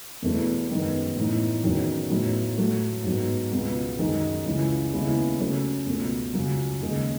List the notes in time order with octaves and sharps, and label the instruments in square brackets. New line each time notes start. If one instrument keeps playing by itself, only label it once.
[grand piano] E2 B2 A3 E4
F#2 D#3 G#3 B3
A2 E3 B3 D#4
E2 D#3 F#3 C#4
A2 F#3 B3 D#4
A2 F#3 A3
G#2 F#3 B3
C#2 B2 G#3 B3
F#2 D#3 G#3 D#4
C#2 C#3 E3 G#3
D#2 C#3 G#3 B3 E4
C#3 F#3 A3 C#4
C#2 B2 A3
C#2 C#3 F#3
D#2 C#3 G#3